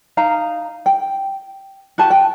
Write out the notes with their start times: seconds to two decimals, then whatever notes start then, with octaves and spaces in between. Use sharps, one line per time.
0.17 D#4 F5 A#5
0.86 G5
1.98 F#4 G4 A5
2.10 G5